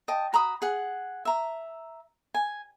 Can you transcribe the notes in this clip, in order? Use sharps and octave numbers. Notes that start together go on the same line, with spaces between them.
D#5 G5 A5
F#4 A#5 B5 D#6
G#4 F#5
E5 A#5
G#5